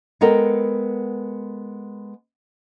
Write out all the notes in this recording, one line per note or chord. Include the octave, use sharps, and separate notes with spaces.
G#3 B3 A4 A#4 G5